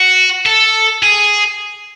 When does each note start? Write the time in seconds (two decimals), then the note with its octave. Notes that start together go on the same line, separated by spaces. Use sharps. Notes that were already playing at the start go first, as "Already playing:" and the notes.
Already playing: F#4
0.46 A4
1.03 G#4